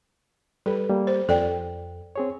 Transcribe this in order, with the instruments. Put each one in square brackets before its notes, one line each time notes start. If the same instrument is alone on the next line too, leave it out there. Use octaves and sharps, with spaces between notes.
[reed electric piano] G3 B4 [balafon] A4
[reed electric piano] G3 A#3
[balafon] C5
[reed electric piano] F2 [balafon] A4 D5 G5
[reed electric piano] C4 G#4 C#5